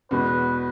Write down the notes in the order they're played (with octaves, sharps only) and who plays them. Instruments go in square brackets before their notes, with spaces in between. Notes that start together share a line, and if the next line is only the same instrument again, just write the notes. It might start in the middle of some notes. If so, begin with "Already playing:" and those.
[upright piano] E2 B2 G#3 [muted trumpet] B4